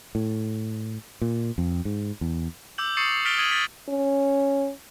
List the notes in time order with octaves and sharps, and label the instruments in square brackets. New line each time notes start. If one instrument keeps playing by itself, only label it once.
[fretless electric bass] A2
A#2
F2
G#2
E2
[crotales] D6 E6 G6 F#7
C#6 D#6 A6 C7 C#7 F#7
C7
F6 A6 B6 D7 F7 G7
D#6 G#6 D#7 F#7
A6 B6
[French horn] C#4